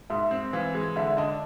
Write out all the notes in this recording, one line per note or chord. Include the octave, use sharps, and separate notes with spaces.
G#2 E5
C4
E3 F5
G#3
D3 E5
D4 D#5